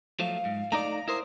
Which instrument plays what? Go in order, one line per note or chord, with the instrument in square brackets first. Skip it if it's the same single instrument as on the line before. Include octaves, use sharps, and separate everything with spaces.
[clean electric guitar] F3 F#3 A3 [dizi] F5
[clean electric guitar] G#2
[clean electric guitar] A3 D#4 D5 [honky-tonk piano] A#5
[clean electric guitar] E4 A#4 C5 [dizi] D#6